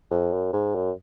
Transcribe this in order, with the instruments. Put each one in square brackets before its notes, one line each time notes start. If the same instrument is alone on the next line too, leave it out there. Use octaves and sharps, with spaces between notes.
[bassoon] F2
F#2
G#2
F#2